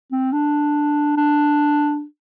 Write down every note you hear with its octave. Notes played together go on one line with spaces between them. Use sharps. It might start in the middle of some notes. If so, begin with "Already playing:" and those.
C4
D4
D4